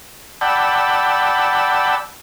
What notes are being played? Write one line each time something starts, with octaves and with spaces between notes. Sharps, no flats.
D5 F#5 G5 A5 B5 E6